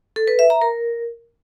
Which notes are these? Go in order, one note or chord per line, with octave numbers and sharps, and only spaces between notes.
A4
B4
E5
A#5
A#4